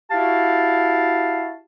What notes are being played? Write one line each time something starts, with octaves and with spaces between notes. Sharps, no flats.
E4 F#4 G4 F5 A5